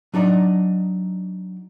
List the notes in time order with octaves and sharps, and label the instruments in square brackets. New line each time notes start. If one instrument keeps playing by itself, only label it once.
[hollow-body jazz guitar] F#3 D4 D#4 D5 D#5